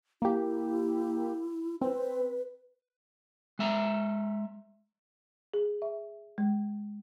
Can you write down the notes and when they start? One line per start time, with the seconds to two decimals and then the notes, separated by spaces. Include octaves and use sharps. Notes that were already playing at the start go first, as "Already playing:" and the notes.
0.22 A#3 E4 G4
1.81 C4 B4
3.59 G#3 E5 A#5
5.54 G#4
5.82 E5
6.38 G#3